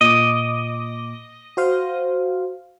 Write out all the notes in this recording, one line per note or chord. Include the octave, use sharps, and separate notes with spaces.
A#2 D#5 D6
F#4 C5 F5